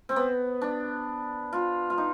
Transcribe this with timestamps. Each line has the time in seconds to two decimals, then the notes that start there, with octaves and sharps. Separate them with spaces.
0.09 C4
0.16 B3
0.62 D4
1.53 F4
1.90 F4
1.98 D#4